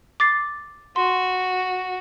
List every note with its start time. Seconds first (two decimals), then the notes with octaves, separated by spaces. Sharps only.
0.20 D6 A6 C7
0.96 F#4 C6